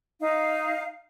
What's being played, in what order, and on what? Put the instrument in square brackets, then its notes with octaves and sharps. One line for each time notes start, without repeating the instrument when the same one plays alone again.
[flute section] D#4 F5